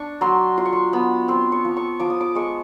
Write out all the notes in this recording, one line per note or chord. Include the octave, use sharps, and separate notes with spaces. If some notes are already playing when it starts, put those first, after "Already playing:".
Already playing: D4 C#6
F#3 C6
F4 C6
C#6
C6
B3 B5
C4 C6
C#6
F3
C#6
F3 D6
D#6
D6
G#3 C#6